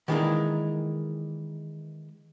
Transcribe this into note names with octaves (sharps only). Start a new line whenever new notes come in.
D#3 E3 G#3 A#3 D4 D#4